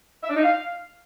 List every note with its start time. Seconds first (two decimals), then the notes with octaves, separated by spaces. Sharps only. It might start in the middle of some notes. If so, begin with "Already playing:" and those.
0.22 E5
0.29 D4
0.36 D#4
0.43 F5